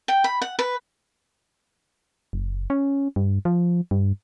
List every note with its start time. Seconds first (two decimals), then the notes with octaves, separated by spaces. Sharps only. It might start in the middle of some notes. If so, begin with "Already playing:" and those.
0.08 G5
0.24 B5
0.42 F#5
0.59 B4
2.33 F#1
2.70 C#4
3.16 G2
3.45 F3
3.91 G2